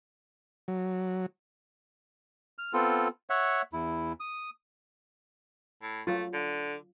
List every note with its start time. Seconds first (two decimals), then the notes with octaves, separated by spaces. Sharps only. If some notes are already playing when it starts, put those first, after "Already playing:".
0.68 F#3
2.58 F6
2.73 B3 C4 F4 A4
3.30 C#5 E5 F#5
3.73 E2 E4
4.20 D#6
5.82 A2
6.07 F#3 A3 F4
6.33 D3